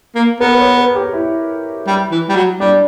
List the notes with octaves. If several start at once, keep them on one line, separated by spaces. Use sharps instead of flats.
A#3
B3 A#4
B4
C#5
B4
G4
E4
G3
E3
G3
F#3
G3 D4